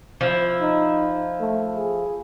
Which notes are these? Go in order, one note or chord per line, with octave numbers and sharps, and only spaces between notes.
F3 E4
D#4
A3
G#4